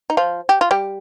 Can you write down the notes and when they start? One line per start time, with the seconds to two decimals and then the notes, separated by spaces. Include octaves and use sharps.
0.10 D#4
0.17 F3 F4
0.49 G4
0.61 F4
0.71 G3 G4